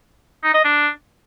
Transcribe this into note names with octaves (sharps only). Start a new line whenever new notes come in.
D#4
D#5
D4